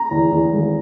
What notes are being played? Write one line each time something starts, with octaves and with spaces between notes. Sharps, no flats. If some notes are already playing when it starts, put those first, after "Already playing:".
Already playing: A#5
E2
E2
G#1